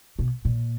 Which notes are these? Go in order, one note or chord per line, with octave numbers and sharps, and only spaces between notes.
B2
A#2